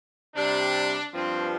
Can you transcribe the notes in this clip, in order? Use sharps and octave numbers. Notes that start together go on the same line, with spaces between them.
C3 G3 D4
G2 F3 C4